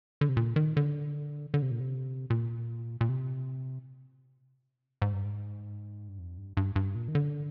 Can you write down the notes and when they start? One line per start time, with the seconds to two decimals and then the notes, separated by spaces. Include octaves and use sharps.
0.21 D3
0.29 C3
0.37 A#2
0.56 D#3
0.77 D3
1.54 D3
1.62 C3
1.71 A#2
1.80 C3
2.30 A#2
3.01 A#2
3.09 C3
5.02 G#2
5.13 G2
5.25 G#2
6.09 G2
6.18 F2
6.37 G2
6.57 G2
6.76 G2
6.95 A#2
7.08 D#3
7.15 D3